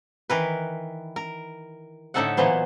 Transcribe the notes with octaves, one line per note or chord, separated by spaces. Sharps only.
D#3 E3 A#4 B4
A#4
A2 D3 D#4 A4 E5 F#5
A#2 E3 F#3 B3 C5